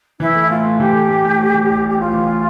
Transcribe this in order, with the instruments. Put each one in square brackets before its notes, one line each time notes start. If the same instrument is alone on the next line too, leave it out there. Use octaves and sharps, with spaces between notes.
[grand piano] E3 [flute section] E4
[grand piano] A3
[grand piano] A2 [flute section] F4
[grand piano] A2
[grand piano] E3 [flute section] G4
[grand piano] A3
A2
A2
A2
E3
A1
[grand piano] A1 [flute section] G4
[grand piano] A2 [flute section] F4
[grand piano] E3